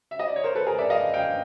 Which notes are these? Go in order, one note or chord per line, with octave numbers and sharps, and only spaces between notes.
E5
D#5
D5
C#5
A#4 C5
A4 B4
G#4 A#4
D5 E5
D#5 F5
F5 G5